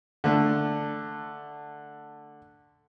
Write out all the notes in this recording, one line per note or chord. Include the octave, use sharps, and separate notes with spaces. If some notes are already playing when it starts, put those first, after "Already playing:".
D3 A3